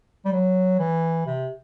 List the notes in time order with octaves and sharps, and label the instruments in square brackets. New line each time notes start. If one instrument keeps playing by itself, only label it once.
[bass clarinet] G3
F#3
E3
C3